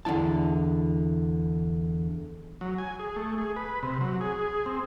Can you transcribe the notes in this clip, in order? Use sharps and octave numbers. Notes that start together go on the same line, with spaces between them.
E2 D3 F#3 E4 A5
F#3
G#5
G#4
A3
G#4
B4
C3
F#3
G#4
C4